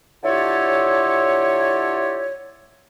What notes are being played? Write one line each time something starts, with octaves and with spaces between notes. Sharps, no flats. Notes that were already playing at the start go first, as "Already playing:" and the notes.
D3 E4 F4 G4 A4 C#5